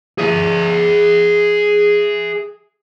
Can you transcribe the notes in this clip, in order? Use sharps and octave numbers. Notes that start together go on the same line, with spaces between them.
G#4 E5